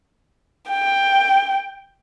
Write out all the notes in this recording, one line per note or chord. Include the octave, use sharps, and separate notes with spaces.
G5